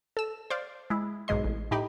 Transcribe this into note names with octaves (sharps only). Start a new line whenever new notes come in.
A4 E6
C5 D5 F5
G#3 E4
B1 G#2 G#3 D#5 C6
A1
A2 D#4 G4 B5